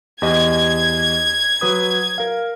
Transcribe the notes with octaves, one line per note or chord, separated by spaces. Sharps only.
E2 G4 D#5 G#6
F#3 B4 D#6
A#4 F5